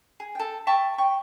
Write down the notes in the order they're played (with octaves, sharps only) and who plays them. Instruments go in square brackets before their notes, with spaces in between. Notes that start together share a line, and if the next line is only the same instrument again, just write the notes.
[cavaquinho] G#4
A4 G5
E5 G5 A5 C#6
C#5 G5 C#6